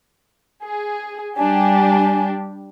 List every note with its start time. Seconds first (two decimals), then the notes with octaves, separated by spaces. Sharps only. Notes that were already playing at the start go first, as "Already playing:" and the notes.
0.63 G#4
1.36 G3 D4 G4 G#5